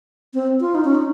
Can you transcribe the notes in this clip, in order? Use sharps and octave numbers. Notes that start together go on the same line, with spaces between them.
C4
F4
D#4
C#4
D#4